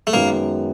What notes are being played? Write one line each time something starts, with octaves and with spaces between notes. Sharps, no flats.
A3
F#2 D#3 G#3 A#3 B3